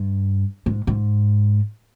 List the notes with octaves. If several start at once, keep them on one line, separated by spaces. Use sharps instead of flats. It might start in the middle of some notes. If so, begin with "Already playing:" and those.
Already playing: G2
G#2
G#2